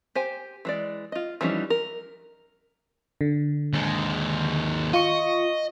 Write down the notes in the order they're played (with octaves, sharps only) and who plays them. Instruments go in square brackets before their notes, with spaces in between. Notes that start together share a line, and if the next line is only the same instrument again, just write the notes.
[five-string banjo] G4 C5 G#5
E3 G#3 D5
F4 D#5
E3 F3 G3 C#4 D#4
A#4
[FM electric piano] D3
[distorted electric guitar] D#2 G#3
[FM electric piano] F4 C#6 [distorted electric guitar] D#5